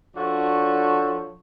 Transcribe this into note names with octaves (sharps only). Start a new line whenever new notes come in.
F3 D4 F#4 A4 C#5